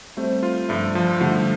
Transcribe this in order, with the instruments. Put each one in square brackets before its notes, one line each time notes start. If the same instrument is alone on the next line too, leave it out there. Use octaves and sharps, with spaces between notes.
[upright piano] G3 C4 [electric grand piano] A3
[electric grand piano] F4
[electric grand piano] G2 [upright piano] F3 A3
[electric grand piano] F3
[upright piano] D3 G3 [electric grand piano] A3